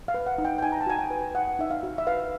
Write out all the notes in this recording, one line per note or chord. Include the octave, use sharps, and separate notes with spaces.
F5
B4
F#5
D#4
G5
G5
D#4 G#5
A#5
A5
F#4 G#5
G5
B4
D#4 F#5
D#4 E5
F5
F#4
E5
B4 F5